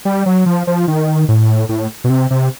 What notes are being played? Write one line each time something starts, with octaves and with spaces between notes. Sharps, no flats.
G3
F#3
F3
F3
D#3
A2
A2
B2
C3
C3